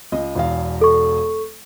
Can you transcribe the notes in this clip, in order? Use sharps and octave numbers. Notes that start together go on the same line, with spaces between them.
C#2 D#5
E1 E2 F5
A4 C#6